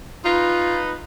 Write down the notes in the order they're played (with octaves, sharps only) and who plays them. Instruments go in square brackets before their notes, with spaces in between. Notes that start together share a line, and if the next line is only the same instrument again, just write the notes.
[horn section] D#4 B4 [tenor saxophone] F4